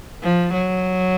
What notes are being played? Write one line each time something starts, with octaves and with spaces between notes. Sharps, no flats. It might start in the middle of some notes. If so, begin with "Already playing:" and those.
F3
F#3